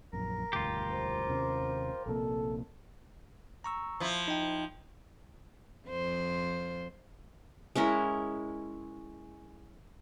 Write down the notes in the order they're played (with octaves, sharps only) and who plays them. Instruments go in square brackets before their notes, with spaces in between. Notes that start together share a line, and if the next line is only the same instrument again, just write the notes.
[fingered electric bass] A#1 F#2 [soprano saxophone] A#4
[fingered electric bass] E1 D2 G2 [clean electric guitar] F4 G4
[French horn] C5
[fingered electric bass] D#2 C3 C#4
[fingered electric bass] A#1 C3 A#3 [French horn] A4
[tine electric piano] A#5 C#6 E6
[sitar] F3 E4
[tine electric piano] D#4 G5
[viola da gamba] F2 C5
[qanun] G#3 C#4 E4 A#4